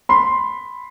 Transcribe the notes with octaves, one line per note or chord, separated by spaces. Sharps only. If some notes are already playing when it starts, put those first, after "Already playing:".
B5 C6